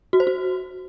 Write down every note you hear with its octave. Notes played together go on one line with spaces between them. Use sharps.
F#4
C5
F#4